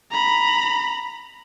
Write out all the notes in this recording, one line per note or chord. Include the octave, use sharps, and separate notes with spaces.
A#5 B5